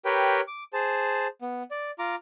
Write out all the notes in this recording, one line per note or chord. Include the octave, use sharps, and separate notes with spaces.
G4 A#4 B4 C#5 G5 B5
D6
G#4 C5 A5
B3
D5
F4 A#5 D6